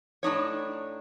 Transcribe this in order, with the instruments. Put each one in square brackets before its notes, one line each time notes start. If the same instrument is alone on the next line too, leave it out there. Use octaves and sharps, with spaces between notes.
[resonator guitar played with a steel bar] A2 D4 D#4 C#5